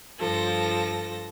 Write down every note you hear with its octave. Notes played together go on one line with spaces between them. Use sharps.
G2 F3 A4 A#6